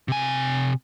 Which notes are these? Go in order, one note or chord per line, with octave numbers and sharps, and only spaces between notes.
C3 G#5